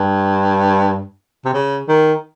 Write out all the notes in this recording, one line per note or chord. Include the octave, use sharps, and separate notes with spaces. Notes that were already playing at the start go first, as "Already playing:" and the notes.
Already playing: G2
C3
C#3
D#3